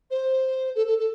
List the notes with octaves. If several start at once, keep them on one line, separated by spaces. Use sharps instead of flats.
C5
A4
A4
A4